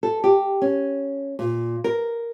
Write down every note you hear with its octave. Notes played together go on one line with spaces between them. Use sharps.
A4
G4
C#4
A#2
A#4